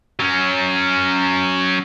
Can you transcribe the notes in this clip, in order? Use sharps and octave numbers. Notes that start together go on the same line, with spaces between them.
F#3 C#4